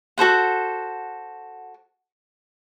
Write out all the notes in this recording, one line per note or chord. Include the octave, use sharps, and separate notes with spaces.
F#4 A4 C5 F#5